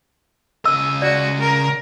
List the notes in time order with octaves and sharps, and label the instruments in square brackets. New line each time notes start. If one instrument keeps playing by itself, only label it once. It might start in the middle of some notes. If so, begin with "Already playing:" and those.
[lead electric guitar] C#3 D#5 [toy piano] E6
[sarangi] F#4 [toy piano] D5
[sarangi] A#4